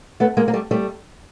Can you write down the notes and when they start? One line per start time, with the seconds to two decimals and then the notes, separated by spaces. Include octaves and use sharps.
0.20 A3 B3
0.37 G#3 A#3
0.48 A#3
0.54 G3 A3
0.71 G3 A3